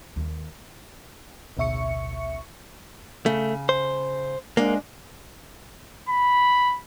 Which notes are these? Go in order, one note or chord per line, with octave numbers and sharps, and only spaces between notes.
D#2
A1 D2 B2 E5 C#6 C#7
C#3 A3
C5
G#2 G#3 A#3 D4
B5